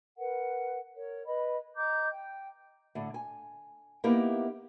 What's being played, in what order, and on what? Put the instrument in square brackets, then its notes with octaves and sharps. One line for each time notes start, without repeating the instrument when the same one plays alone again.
[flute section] A#4 B4 F#5
A#4 C#5
B4 D#5 B5
D#5 A#5 D6 G6
G5
[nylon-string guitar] A2 D3
G#5
A#3 B3 D#4 E4 G4 A#4